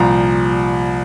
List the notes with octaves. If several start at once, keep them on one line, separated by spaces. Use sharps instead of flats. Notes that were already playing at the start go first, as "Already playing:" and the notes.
Already playing: C2 A#2 F3 A#5